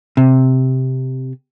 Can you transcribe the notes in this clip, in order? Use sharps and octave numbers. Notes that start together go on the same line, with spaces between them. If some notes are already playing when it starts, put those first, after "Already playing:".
C3